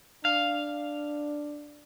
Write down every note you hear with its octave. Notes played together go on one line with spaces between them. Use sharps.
D4 F5